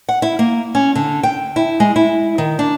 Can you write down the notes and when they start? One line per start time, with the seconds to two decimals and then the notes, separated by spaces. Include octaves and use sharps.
0.09 F#5
0.22 E4
0.39 A#3
0.75 C#4
0.95 D3
1.23 G5
1.56 E4
1.80 G#3
1.96 E4
2.38 D#3
2.59 D4